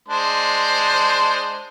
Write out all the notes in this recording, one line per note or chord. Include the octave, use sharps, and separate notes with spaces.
G#3 D4 C5